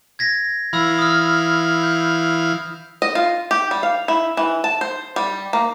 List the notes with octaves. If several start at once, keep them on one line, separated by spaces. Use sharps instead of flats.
G#6 A#6 B6
E3 F5 B5 E6
D#6 F6
G6
D#5
F4
G4
G3
F5
E4
E3
A5
C5
G3
A#3